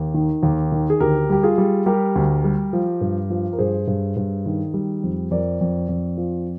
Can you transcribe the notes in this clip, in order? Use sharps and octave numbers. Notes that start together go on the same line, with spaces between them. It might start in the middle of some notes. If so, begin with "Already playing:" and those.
Already playing: D#2
D#3
D#2
D#3
G#4
D2 G4 A#4
G3 G4
F4 G#4
G3
G3 G4 A#4
D2
G3
F3
G2
F3
A#4
G2 G#4 C5
G2
G2
D#3
G3
F2
F2 A#4 D5
F2
F2
F3